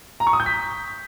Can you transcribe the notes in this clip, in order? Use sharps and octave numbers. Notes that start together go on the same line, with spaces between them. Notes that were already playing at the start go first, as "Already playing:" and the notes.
A#5
C#6
D#6
G6
B6